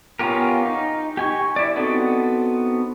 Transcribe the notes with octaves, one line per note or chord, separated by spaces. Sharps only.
B3 C#4 F4 G4 A#4
D#4
G4 G#5 C#6
E4 D5
B3 C4 D#4 F#4 A4